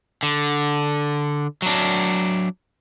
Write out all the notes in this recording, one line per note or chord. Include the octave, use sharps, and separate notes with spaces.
D3
F#3 D4